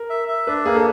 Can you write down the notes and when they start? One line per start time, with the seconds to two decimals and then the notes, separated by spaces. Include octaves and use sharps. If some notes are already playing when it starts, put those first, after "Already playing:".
Already playing: A#4
0.10 E5
0.28 E5
0.47 D4 B4
0.65 A#3 G#4
0.75 A4